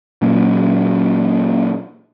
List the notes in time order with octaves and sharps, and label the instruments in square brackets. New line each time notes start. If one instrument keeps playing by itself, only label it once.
[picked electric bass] A#2 F#3 A#3 C#4